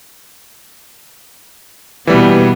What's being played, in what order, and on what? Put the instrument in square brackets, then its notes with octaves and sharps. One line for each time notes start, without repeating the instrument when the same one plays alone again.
[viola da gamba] B2 B3 [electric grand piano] E3 G3